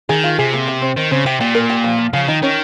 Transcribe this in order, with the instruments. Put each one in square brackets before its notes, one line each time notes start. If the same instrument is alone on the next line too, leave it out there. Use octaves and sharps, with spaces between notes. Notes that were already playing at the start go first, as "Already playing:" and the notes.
[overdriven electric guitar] D#3 [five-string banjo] G#4
[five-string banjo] F4
[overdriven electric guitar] C3 [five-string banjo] G#4
[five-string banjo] A#3
G4
C4
[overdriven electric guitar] D#3 [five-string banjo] C4
[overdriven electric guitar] C#3 [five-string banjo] C4
[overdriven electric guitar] C3 [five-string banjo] G4
[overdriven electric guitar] A#2 [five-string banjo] G4
[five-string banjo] A#4
G4
F3
F3
[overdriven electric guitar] C#3 [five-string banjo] F3
[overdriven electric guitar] D#3 [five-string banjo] D#4
[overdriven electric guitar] D#3 [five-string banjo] C#4